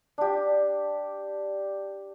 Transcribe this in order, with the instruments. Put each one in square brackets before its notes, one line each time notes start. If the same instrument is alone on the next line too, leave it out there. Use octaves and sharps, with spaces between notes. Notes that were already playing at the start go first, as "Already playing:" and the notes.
[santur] D4 G4